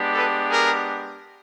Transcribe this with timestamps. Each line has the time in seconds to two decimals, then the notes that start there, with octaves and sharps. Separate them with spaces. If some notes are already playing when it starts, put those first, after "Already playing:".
Already playing: G#3 B3 D4 G4
0.14 A4 B4
0.50 G#4 A#4